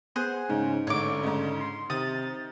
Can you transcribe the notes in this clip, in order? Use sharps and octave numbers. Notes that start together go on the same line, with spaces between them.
B3 G#4 C5 F#5
G#2 C#3 D#4
A1 G#2 D3 C#5 D6
G#2 C#3 D#4
C6
C3 D#3 D#6 A6